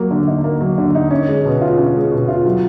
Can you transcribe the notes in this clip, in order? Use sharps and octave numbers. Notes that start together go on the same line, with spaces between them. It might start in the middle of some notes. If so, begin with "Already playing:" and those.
Already playing: F#3 A#3
D3
D#4
A#3
F#3
D3
D#4
C#4
G#3
B2
F4
C#4
G#3
B2
F4
F#3